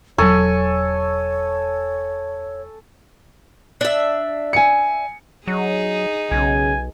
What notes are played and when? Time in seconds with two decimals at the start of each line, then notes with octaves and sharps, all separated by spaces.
0.18 E1 F#3 A4 C#5 G#5 C#6
3.81 D4 E5
4.53 G#5 C#7
5.47 F#3 D#4 G#4
6.31 B1 C#3 G#5